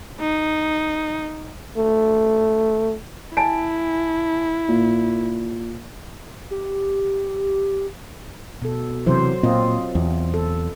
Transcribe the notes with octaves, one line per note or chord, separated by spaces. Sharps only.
D#4
A3
E4 G#5 A5 D7
A#2
G4
B2 A4
C3 E3 F#3 C5
A#2 C4 F4 D#5
E2
A4